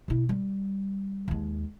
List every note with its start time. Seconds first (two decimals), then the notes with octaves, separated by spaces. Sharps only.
0.08 B2 E4
0.29 G3
1.28 D#2 G#3